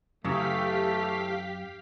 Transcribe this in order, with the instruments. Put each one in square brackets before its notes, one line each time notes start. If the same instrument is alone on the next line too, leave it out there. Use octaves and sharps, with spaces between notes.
[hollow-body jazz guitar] F#2 [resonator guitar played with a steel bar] C#3 E3 F#3 [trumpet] A3 [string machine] G4 F5 B6